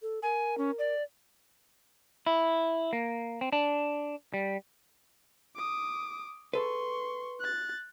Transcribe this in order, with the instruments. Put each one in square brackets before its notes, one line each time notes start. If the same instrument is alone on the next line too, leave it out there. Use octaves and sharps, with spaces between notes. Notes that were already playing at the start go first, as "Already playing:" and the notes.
[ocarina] A4
[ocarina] A#4 [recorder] G#5
[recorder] C#4
D5
[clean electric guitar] E4
A#3
C4
D4
G3
[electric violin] D6 D#6
[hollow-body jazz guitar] G#4 A4 B4 [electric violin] C6 C#6
[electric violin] F#6 A6